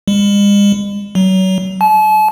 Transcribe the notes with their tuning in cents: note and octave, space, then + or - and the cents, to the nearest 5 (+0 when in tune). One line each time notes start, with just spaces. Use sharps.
G#3 -45
F#3 +30
A5 -40